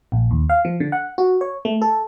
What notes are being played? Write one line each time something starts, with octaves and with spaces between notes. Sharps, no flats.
A#1
D#2
F5
F3
D3
F#5
F#4
C#5
A3
A4